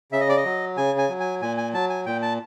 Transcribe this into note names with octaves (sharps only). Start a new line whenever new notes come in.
C#3 E5
D#5
D5
D#5
F#3
C#3 G#5
G#5
F#3
G#5
A#2 G#5
G#5
F#3 A5
G#5
A#2 G5
A5